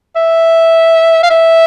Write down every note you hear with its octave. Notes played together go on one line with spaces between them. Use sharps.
E5
F5
E5